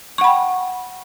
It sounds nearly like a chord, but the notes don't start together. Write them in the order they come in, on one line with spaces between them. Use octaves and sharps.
C#6 F#5 B5 G5